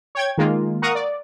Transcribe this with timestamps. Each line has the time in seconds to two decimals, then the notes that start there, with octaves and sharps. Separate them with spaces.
0.15 C#5 G5 G#6
0.38 D#3 G#3 A#3 F4
0.82 A#4 F5 F#5 A#5 C#6 D#6
0.95 D5